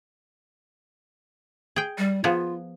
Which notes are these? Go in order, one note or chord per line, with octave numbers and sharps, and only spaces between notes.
G#4 G5
G3
F3 B3 F4 G#4